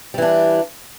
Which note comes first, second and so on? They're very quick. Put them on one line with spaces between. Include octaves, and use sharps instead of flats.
G3 E3 D4